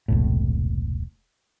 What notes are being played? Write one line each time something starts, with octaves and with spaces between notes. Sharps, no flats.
E1 C2 A2